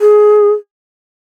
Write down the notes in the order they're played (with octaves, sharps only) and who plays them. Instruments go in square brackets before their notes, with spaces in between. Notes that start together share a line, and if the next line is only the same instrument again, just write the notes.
[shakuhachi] G#4